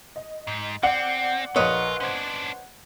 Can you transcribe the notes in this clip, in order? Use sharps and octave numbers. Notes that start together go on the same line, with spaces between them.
D#5
G#2
C4 D5 F#5
A#1 F4 A#4 B4 C#5 D#5
C#4 D4 C5 G#6